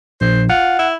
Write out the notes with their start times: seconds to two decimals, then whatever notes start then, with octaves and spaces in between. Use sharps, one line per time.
0.21 A#1 C5
0.50 F4 F#5
0.79 E4